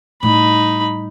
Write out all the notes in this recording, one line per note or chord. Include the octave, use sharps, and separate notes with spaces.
A2 G3 D#4 B5